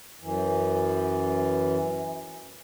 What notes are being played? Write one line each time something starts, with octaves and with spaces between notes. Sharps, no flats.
F#2 E3